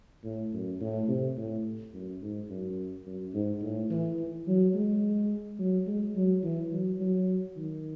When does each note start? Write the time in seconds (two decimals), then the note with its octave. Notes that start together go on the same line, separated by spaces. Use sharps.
0.24 A2
0.53 F#2
0.81 A2
1.08 C3
1.37 A2
1.93 F#2
2.22 G#2
2.50 F#2
3.07 F#2
3.34 G#2
3.62 A2
3.90 E3
4.19 E3
4.47 F#3
4.75 G#3
5.59 F#3
5.87 G#3
6.16 F#3
6.43 E3
6.73 F#3
7.00 F#3
7.56 D#3